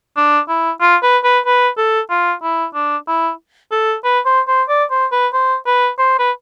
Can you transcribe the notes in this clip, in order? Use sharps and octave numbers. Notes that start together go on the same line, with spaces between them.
D4
E4
F4
B4
B4
B4
A4
F4
E4
D4
E4
A4
B4
C5
C5
D5
C5
B4
C5
B4
C5
B4